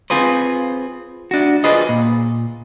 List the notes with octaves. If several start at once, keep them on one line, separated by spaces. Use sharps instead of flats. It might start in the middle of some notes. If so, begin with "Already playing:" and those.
C4 F4 G#4 B4 C5
D4 F#4
F4 G#4 B4 C5 D#5
A#2